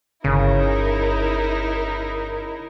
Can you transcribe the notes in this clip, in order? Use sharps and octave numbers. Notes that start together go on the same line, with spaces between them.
G1 C#3 D#4 E4 A#4